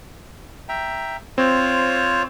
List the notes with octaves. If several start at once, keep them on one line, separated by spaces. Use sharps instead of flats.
E5 G5 A#5
C4 F4 C5 C#5